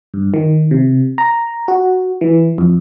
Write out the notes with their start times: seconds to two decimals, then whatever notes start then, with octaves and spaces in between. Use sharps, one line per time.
0.14 G2
0.34 D#3
0.71 C3
1.18 A#5
1.68 F#4
2.21 E3
2.58 F2